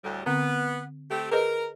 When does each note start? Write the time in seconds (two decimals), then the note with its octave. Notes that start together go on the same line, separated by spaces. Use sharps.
0.04 D2 A2 G3
0.26 D3 B3 C4
1.10 A3 C4 G4
1.32 G#4 A#4 B4 D#5